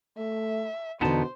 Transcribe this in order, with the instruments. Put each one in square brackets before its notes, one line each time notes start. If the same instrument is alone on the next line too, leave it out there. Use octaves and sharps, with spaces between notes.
[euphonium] A3 [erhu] E5
[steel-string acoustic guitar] E2 D3 [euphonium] B2 [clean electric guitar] B3 D#4 A5 [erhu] C5